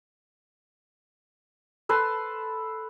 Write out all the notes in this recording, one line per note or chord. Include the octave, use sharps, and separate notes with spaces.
A4 B4 A5 C6